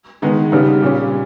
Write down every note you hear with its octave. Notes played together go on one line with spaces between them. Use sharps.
D#3 G#3 B3 D#4 G#4
C#3 G3 B3 D#4
A#2 G3 C#4